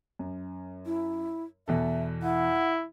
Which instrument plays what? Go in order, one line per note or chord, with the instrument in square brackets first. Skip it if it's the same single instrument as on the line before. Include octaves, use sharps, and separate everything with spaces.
[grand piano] F#2
[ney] E4
[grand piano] E2 B2 A4 [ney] E5
[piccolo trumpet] E4 [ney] F#5